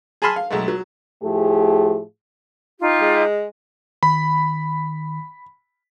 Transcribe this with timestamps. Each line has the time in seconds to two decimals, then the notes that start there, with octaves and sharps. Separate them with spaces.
0.22 G#4 G#5 A5 B5 C6 F6
0.36 F5
0.50 B1 G#3 A3
0.68 F#3
1.22 A2 F3 A3 G4 G#4
2.80 D#4 F4 G4
3.01 G#3
4.03 D#3 B5